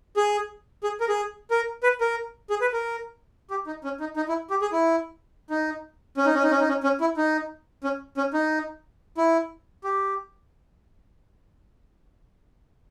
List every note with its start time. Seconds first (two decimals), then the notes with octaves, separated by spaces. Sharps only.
0.17 G#4
0.84 G#4
1.00 A#4
1.09 G#4
1.51 A#4
1.83 B4
2.01 A#4
2.50 G#4
2.61 B4
2.73 A#4
3.50 G4
3.67 D#4
3.84 C#4
4.00 D#4
4.16 D#4
4.28 E4
4.50 G4
4.62 G#4
4.72 E4
5.50 D#4
6.17 C#4
6.26 D#4
6.34 C#4
6.43 D#4
6.51 C#4
6.60 D#4
6.69 C#4
6.83 C#4
7.01 E4
7.17 D#4
7.84 C#4
8.17 C#4
8.34 D#4
9.17 E4
9.84 G4